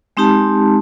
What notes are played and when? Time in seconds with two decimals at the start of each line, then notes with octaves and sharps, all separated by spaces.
0.17 G#3 C4 D#4 G4 A5